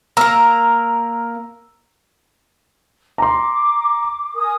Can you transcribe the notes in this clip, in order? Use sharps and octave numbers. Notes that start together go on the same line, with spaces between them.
A#3 A#4 A#5 E6
A#5 C6 D6
A#4 G#5 D#6